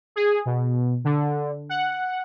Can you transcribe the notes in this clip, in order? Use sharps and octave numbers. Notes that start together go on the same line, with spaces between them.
G#4
B2
D3
F#5